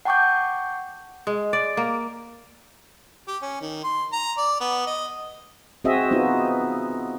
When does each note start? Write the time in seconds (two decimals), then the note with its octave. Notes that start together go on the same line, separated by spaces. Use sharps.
0.05 F#5 G5 A5 C#6 D6 G6
1.27 G#3
1.53 D5
1.77 A#3
3.28 G4
3.42 C#4
3.61 D#3
3.84 C6
4.12 A#5
4.38 D5
4.60 B3
4.87 D#5
5.84 C4 F#4 G#4 D#5 E5
6.11 B3 D#4 F4 F#4